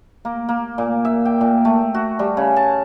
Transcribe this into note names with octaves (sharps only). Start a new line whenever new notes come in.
A#3
A#3
A#2
E5
G5
A#2
A3
F#4
G3
C#3
A5